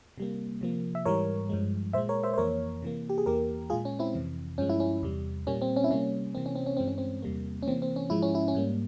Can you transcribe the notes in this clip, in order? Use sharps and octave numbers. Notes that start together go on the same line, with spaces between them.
C3 G3 A#3
C3 F3 A#3
E5
G#2 E3 G3 A#4 C#5
G2 F3 G#3
A#2 G#3 C5 E5
A#4 C#5
C5 E5
C5
F2 E3 A#3 A#4 C#5
C3 E3 A#3
G4
G#4
E2 E3 A#3 G4 A#4
A#2 G#3 F4 G#4
C#4
C4 E4
F2 C3 E3
G2 F3 G#3 C#4
E4
C#4
E2 C3 G3
A#2 G3 A#3 C#4
C4
C#4
E4
C3 G3 A#3 C#4
C3 E3 A#3 C4
C#4
C4
C#4
G2 E3 G#3 C4
C#4
C4
E2 C3 G3 A#3
C#4
C3 E3 A#3 C4
C4
C#4
G#2 F3 G#3 E4
C#4
E4
C#4
G#2 G3 A#3